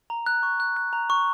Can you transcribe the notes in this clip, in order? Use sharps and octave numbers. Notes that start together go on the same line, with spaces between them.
A#5
F#6
C#6
F#6
F#6
A#5
C#6